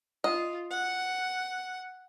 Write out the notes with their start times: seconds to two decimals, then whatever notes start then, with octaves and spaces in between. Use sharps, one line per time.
0.24 F4 D#5
0.71 F#5